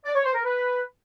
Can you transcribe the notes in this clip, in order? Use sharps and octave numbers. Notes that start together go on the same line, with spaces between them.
D5
C#5
C5
A#4
B4